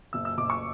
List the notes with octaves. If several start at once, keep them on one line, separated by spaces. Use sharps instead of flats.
F#1 E6
E6
F#1 D6
C#6